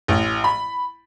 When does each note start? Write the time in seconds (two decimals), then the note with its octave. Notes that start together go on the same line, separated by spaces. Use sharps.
0.08 A1
0.44 B5